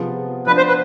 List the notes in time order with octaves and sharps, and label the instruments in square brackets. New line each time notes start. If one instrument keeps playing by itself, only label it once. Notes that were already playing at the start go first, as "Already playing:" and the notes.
Already playing: [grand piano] C3 F3 B3 F4 G#4
[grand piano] F3 B3 D4 [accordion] B4
[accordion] C5
B4